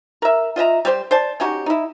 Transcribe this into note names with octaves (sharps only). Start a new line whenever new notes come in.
A#4 E5
F4 D#5 E5 A#5
G3 G4 C5
C5 D5 A5
C#4 D#4 F#4 G4
D#4 E4